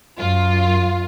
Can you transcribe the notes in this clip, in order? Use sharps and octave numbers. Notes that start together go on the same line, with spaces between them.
F#2 F4